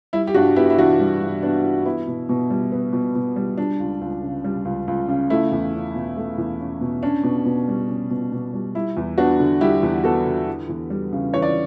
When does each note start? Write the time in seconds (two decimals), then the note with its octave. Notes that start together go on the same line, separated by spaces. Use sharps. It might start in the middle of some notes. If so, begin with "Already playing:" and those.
0.13 G3 E4
0.27 G4
0.34 G2 D4 F#4
0.56 B3 E4 G4
0.70 E4
0.78 E3 D4 F#4
1.00 G3
1.21 G2
1.43 B3 D4
1.64 E3
1.85 B3 E4
2.07 B2
2.29 B2
2.50 G3
2.72 B3
2.93 B2
3.15 B2
3.36 G3
3.58 G3 D4
3.80 C#2
4.01 C#2
4.23 C#3
4.44 G3
4.65 C#2
4.88 C#2
5.09 C#3
5.30 A3 E4
5.52 E2
5.74 C#4
5.95 B2
6.17 A3
6.38 E2
6.60 C#4
6.81 B2
7.03 C#4 D4
7.24 B2
7.45 B2
7.68 G3
7.89 C#4
8.10 B2
8.32 B2
8.54 G3
8.75 G3 E4
8.97 E2
9.18 B3 D4 F#4
9.40 D3
9.61 G3 E4 G4
9.83 E2
10.04 B3 F#4 A4
10.26 D3
10.47 E3
10.69 E2
10.90 G3
11.13 C#3
11.33 E3 C#5
11.42 D5